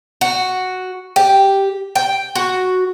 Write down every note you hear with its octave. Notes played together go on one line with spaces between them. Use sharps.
F#4
G4
G5
F#4